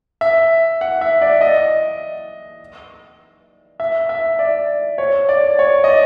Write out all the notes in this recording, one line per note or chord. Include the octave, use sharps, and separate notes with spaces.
E5
F#5
E5
D5
D#5
E5
E5
D5
C#5
D5
C#5
D#5
D5